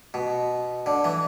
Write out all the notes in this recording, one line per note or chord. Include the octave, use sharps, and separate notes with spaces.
B2
D3
E3